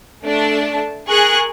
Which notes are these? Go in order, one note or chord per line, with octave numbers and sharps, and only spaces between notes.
A3 D4 A5
G#4 A#4 C#6 F#6